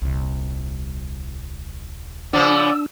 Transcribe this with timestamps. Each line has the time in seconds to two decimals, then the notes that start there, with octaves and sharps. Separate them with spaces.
0.02 D#1 C2
2.33 C#3 F3 B3 D4 D5 E6